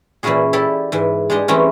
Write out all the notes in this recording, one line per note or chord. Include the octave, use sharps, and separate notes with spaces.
A#2 E3 C#4 E4 F#4 G#4
E4 G4 A4 D5
G#2 E3
G#3 D4 G4 D#5
E3 G3 A3 C4 C#4 F#4